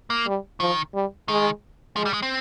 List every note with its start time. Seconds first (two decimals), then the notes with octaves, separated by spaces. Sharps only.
0.10 A#3
0.26 G3
0.60 D#3 F3
0.94 G3
1.28 D#3 G#3
1.96 F3 G#3
2.06 G3
2.14 G#3
2.22 C4